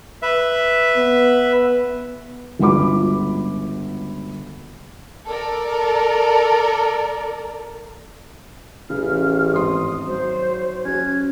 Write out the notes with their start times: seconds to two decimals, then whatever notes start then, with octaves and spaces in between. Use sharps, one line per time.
0.22 B4 E5
0.97 B3
2.59 G1 C#2 F#4 B5 D6
5.28 A4 A#4 D5
8.90 A1 C#3 F6
9.53 G#1 C6 D#6
10.06 F#3 C5
10.85 C#4 F#4 G#6